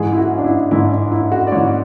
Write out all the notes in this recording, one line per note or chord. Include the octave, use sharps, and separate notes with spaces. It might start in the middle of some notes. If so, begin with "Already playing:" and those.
Already playing: G#2 E3 G#4
E4
F#4
D4
E4
G#2 E3 E4
D4
E4
F#4
D5
G#2 E3 C#5